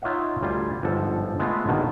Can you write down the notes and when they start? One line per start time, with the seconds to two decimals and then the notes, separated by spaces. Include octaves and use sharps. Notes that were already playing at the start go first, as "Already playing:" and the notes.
0.02 D#4 F4 C#5 D#5 E5 F#5
0.41 D2 G3 F4 G#5
0.83 G1 G#2 F3 A4
1.40 G#3 A3 B3 F4 A4 B4
1.67 A#1 B2 D3 D#3 F3